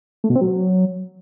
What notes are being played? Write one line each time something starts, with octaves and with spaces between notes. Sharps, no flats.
A3
B2
C4
F#3